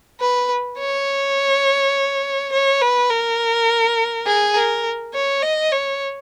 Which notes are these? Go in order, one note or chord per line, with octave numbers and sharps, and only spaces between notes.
B4
C#5
C#5
B4
A#4
G#4
A#4
C#5
D#5
C#5